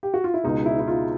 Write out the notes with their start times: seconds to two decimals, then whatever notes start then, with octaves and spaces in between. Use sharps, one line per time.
0.03 G4
0.14 F#4
0.24 F4
0.34 E4
0.43 C#2 B2 G#3 D#4
0.66 E4
0.79 E4
0.88 F4